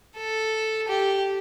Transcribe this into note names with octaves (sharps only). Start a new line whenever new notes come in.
A4
G4